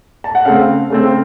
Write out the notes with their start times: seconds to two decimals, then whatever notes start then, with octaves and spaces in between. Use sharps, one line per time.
0.24 A5
0.35 F#5
0.45 C#3 A3 C4 F5
0.90 C#3 A3 C4